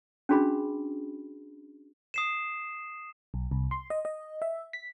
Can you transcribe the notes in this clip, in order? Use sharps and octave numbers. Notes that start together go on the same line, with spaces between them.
C#4 D4 F#4 G#4 B5
D#6 C7 E7
B1
C2
C6
D#5
D#5
E5
B6